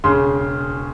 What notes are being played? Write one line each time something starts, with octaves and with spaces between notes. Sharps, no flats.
E1 C#3 C6